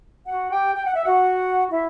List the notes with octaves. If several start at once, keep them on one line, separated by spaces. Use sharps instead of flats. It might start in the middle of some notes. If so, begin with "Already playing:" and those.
F#4 F#5
G4 G5
G5
F#5
E5
F#4 F#5
E4 E5